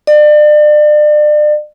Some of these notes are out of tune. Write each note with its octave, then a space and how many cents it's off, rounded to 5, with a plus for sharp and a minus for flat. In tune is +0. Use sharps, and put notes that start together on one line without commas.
D5 +35